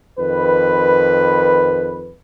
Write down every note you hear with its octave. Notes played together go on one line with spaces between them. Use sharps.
F2 D#3 B4